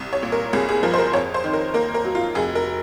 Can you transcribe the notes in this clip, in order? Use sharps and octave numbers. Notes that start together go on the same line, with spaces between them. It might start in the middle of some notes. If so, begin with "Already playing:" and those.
Already playing: C2
C#5
A#2
A#4
C2 G#4
G#4
F3 A#4
C5
A#4
F2 C#5
C5
D#3
A#4
A#3 A#4
A#4
F#3
F4
F1 G#4
A#4